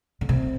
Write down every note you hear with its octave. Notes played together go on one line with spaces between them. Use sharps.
D3
C3